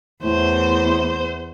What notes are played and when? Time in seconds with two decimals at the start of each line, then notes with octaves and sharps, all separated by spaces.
0.24 E2 A2 C5